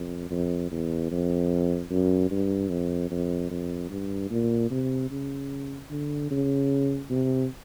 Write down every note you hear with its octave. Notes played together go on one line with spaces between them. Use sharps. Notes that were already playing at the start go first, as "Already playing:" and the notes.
Already playing: F2
F2
E2
F2
F#2
G2
F2
F2
F2
G2
A#2
C3
C#3
D3
C#3
C3